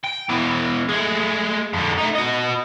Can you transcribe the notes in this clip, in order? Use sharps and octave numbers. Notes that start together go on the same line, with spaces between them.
G5
B2 E3
G#3 A3
F2 D3
A3 D#4
F#4 D#5